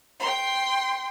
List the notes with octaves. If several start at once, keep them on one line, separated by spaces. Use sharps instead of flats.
G5 C6